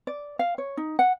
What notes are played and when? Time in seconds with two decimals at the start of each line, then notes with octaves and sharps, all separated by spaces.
0.07 D5
0.39 F5
0.58 C#5
0.77 D#4
0.99 F#5